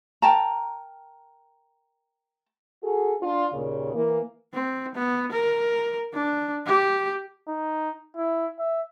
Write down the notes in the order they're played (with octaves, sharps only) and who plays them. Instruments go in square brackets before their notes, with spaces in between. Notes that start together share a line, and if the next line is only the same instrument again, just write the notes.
[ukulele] A#4 G5 A5 A#5
[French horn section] F#4 G#4 A4
D4 F4
D#2 A#2 C#3
E3 A#3
[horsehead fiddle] C4
B3
A#4
D4
G4
[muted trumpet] D#4
E4
E5